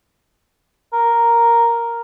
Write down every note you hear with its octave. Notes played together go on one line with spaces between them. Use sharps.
A#4